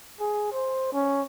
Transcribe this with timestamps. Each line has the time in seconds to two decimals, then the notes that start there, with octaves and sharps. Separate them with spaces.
0.20 G#4
0.52 C5
0.93 C#4